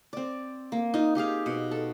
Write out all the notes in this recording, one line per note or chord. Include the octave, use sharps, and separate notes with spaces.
C4 D5
A#3
D#4 F4
D#4 G4 G#4 F5
B2
A4